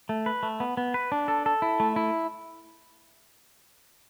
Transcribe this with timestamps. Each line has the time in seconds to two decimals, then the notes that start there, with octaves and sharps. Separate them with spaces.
0.09 A3
0.26 B4
0.43 A3
0.60 B3
0.77 B3
0.94 B4
1.12 D4
1.28 A4
1.46 A4
1.62 E4
1.80 A3
1.96 E4